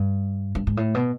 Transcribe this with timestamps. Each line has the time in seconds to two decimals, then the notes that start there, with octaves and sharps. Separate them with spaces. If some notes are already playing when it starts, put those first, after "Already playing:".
Already playing: G2
0.55 G2
0.67 G#2
0.77 A2
0.95 B2